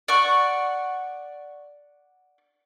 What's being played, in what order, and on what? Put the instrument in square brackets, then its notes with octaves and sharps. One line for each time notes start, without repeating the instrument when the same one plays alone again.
[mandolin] D5 F#5 C#6